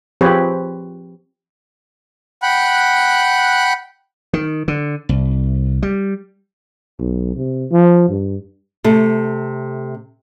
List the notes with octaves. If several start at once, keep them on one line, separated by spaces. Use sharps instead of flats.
F3 C4 G4 G#4 B4 C#5
F#5 G5 B5 F#6
D#3
D3
C2
G3
B1
C3
F3
G2
C3 A3